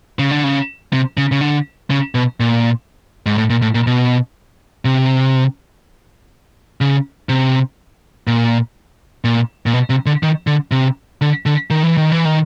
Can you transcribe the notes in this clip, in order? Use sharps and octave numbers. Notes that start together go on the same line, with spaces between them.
C#3
D3
C#3
C3
C#3
C#3
D3
C#3
B2
A#2
G#2
A2
A#2
A2
A#2
B2
C3
C#3
C3
A#2
A#2
A#2
B2
C3
D3
D#3
D3
C3
D3
D3
D#3
E3
D#3
E3
D#3